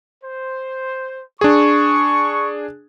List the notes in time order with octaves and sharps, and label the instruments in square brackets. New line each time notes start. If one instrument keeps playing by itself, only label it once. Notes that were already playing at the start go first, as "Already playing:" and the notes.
[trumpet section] C5
[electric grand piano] D4 G#4 [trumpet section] C#6